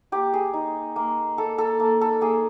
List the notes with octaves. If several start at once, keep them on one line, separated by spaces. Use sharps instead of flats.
A#3 G4
G#4
D#4
A#3
A#3 A4
A4
A#3
A4
A#3 G#4